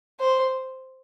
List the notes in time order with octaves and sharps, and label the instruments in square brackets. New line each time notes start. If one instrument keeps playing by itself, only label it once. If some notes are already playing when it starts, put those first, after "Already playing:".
[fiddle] C5